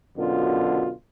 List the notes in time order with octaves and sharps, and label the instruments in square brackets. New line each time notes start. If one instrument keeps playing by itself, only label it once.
[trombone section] F#2 B2 D3 F4